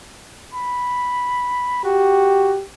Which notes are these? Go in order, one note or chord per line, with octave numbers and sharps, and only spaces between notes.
B5
F#4 G4